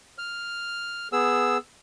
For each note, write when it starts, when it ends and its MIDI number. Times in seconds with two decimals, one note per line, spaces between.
0.18 1.08 89
1.13 1.57 59
1.13 1.57 68
1.13 1.57 88